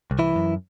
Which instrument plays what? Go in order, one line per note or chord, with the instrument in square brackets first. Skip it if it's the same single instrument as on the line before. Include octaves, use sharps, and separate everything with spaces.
[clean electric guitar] C2
E3 E4
F#2